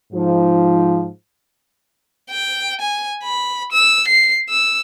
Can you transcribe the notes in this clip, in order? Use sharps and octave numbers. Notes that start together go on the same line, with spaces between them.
G#2 F3
G5
G#5
B5
E6
C7
E6